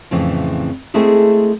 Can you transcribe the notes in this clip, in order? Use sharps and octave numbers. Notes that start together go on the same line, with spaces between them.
F2 A2 C#3 E3 C4
G#3 A3 C4 E4 G#4 A4